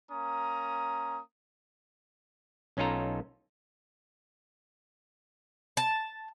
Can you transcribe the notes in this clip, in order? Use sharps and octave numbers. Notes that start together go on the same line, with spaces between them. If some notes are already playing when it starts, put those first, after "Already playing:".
A#3 C#4 A#5 D#6
B1 C#4 D#4 F4 A4 A#5
A5